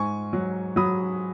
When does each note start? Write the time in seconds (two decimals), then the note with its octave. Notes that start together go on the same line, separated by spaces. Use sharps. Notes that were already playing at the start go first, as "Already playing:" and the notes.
Already playing: G#2 G#5 C#6
0.33 F#3
0.76 F#3 B5 D#6